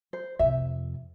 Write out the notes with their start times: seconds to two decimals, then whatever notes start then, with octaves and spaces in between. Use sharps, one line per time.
0.13 C5
0.39 F2 C3 E5